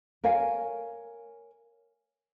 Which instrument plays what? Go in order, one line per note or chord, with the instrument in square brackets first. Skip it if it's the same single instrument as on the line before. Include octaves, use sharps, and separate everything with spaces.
[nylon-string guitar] A#4 C#5 F5 G#5